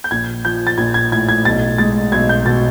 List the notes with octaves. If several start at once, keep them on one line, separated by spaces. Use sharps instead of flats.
G6
A#1 G#6
F3 G6
A6
A#1 G#6
G#6
A2 G#6
G#6
B1 A6
G#3 A6
B1 G#6
G6
B2 A6